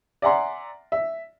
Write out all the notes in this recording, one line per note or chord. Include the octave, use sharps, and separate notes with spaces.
D5 E5 F#5 G#5 A#5 C6
E5